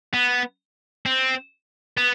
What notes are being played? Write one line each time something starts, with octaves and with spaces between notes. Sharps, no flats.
B3
C4
B3